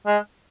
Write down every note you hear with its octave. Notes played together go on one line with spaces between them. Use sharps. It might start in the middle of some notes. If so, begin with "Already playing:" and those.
G#3